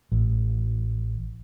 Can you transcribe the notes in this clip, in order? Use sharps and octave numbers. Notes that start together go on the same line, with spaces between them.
A1